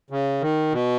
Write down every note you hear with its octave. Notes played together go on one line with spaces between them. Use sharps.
C#3
D#3
B2